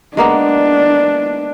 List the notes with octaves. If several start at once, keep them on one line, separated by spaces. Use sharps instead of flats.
G#3 A#3 B3 D4